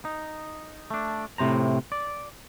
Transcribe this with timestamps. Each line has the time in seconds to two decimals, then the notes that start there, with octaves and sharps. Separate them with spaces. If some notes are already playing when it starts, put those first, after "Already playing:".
0.05 D#4
0.91 A3 D4
1.38 A2 C3 C5 A#5
1.92 D5